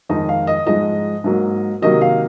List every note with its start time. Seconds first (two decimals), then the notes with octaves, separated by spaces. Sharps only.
0.09 F2 D#3 G#3 D#4 D#5
0.29 F5
0.47 D#5
0.66 G#2 F3 G#3 D#4 D#5
1.24 G#2 F#3 A#3
1.82 C3 D#3 F#3 A#3 D#5
2.01 F5